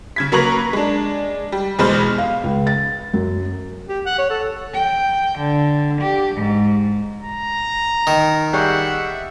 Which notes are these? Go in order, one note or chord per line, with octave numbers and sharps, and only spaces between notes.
C#3 G#6 B6
F#3 A#3 B4 A#5 C#6 F#7
G#3 D4
G3
E2 B2 G#3 C5 B5 F6
F5
C#2
A6
F#2
G4
F#5
C#5
A4
G5
D3
G4
G#2
A#5
D#3
G3 G#4 E5 F#5 C#6